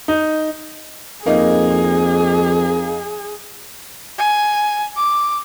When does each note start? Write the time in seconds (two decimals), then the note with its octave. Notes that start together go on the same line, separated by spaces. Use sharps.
0.08 D#4
1.26 F2 A#3 D#4 G#4
4.18 G#5
4.96 D6